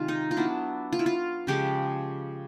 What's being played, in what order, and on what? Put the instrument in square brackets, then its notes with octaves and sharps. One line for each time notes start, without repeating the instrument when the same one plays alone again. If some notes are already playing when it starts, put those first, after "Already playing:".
Already playing: [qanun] C3 D#3 G#3 F4
D#4
F4
F#3 B3 D4 E4
F4
E4
F4
C#3 F3 G#3 G4